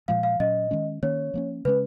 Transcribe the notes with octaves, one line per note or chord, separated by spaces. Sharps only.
A#2 F3 G#3 F5
F5
A#2 F#3 C#4 D#5
D#3 G#3 C#4
D#3 A#3 C#4 C#5
F3 A#3 C#4
C#3 G#3 C#4 B4